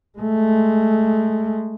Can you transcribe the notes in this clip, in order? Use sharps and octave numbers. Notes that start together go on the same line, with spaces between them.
G#3 A3